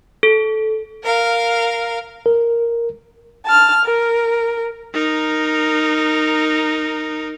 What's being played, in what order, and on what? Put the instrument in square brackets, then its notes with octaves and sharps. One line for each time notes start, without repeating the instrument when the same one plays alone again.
[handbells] A4
[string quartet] A#4 F5
[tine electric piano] A#4
[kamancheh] A5 F6
A#4
[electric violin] D#4 A#4